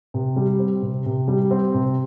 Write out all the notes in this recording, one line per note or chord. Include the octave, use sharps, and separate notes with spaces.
C3
G3
C4
C3
C3
G3
C4
C3